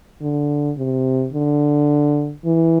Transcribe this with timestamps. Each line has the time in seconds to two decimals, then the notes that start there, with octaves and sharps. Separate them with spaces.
0.22 D3
0.78 C3
1.33 D3
2.45 E3